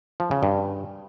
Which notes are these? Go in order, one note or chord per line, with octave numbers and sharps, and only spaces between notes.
F3
C#3
G2